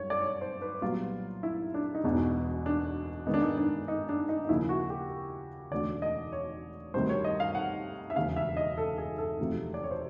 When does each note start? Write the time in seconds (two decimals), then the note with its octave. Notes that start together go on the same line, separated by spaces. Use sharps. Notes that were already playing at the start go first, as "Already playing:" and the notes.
Already playing: F#2 G3 C#5
0.10 D5
0.21 C#5
0.41 C5
0.62 B4
0.82 C2 A#2 F#3 B3 F4
1.43 E4
1.74 D4
1.95 D#4
2.04 E1 E2 B2 D4
2.66 D4
3.26 G#2 D#3 G#3 B3 D#4
3.34 D4
3.41 D#4
3.58 D4
3.88 D#4
4.09 D4
4.29 D#4
4.45 D#4
4.49 D#2 C#3 F3 A#3 E4
4.69 F#4
4.90 G4
5.71 E1 D2 D3 D5
6.02 D#5
6.32 C#5
6.94 D2 C3 D#3 G3 C5
7.09 C#5
7.24 D#5
7.40 F5
7.55 F#5
8.10 E5
8.16 E1 D#2 C#3 F5
8.37 E5
8.57 D#5
8.78 A4
8.98 G#4
9.18 A4
9.38 E1 D2 C3 F3
9.74 D5
9.83 C#5
9.91 C5